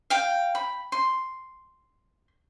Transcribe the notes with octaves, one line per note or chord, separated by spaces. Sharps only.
F5 G5
B5
C6